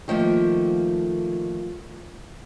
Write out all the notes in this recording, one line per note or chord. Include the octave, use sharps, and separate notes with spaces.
D#3 F3 A3 A#3